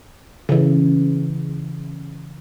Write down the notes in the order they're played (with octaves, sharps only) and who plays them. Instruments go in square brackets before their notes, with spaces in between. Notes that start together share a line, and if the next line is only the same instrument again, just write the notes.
[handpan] C#3 E3